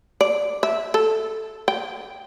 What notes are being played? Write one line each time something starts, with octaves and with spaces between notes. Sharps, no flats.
D5
E5
A4
G5